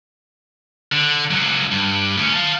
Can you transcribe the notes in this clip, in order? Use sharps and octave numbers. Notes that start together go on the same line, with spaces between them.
D3
C#2 F#3
G2
D2 C#4
F5 A5